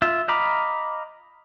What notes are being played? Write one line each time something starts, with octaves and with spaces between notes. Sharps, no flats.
F4 E5
D#5 F5 A#5 B5 D6